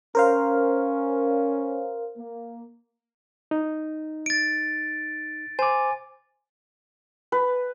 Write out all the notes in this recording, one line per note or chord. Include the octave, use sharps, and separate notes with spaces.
C#4 A#4 C5 F5
A#3
D#4
A6 D7
C5 G#5 D6
B4